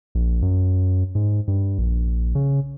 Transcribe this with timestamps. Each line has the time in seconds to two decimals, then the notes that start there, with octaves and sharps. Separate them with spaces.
0.15 A#1
0.42 F#2
1.15 G#2
1.48 G2
1.78 A#1
2.35 C#3